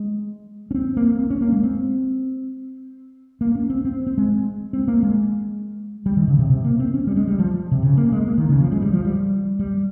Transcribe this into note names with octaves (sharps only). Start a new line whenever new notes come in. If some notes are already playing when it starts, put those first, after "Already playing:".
Already playing: G#3
C#4
C4
A#3
C4
C#4
A#3
G#3
C4
A#3
C#4
C4
C4
C4
G#3
C4
A#3
G#3
G3
D#3
C#3
C3
C3
A#3
C4
C#4
G3
G#3
G3
F3
C3
C#3
A#3
G#3
A#3
D#3
C#3
F3
G#3
G3
F3
G3
G3